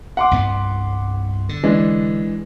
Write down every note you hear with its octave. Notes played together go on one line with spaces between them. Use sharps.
F#5 C6 D6
C2 G2 B3
D3
E3 G#3 D4